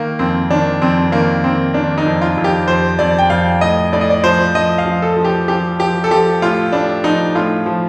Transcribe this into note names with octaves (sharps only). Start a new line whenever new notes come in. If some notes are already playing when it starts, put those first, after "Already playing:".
Already playing: D#3 A#3
F2 C4
D#3 D4
F2 C4
D#3 A#3
D#3 C4
D#3 D4
D#4
F2
F4
F2
G4
F2 C5
F2 D5
G5
F2 F5
A2 D#5
A2 D5
D#5
D5
F3 C5
F3 D#5
F5
F3
A4
F3
G4
F3 G4
F3 G4
A4
F3 G4
A2 F4
A2 D4
F3 D#4
A2 F4
F3